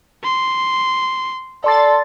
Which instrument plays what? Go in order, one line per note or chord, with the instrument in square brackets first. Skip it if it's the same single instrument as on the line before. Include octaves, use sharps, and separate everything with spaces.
[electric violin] C6
[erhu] A4 [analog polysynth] D5 C6 A6